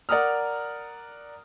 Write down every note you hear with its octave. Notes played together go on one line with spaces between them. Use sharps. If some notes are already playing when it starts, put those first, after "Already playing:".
A#4 D5 F#5 A#5 D#6 F6